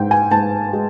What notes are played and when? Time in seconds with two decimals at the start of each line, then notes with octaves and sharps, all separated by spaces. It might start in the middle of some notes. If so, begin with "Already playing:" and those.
Already playing: G#2 G5
0.11 G#5
0.31 G#2 A5
0.73 G#3